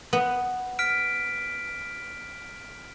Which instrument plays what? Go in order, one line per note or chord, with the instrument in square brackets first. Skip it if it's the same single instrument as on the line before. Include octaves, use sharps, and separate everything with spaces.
[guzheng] B3
[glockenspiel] F6 B6 D7